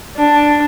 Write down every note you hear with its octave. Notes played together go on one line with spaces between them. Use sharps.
D4